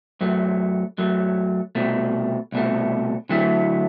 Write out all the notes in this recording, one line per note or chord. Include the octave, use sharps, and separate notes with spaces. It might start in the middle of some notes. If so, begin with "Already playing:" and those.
F#2 F#3 A3
F#2 F#3 A3
C2 B2 A3
C2 B2 A3
D3 F#3 A3 E4